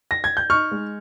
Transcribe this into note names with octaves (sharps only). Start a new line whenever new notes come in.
A#6
G#6
G6
D#4 C#6 F6
G#3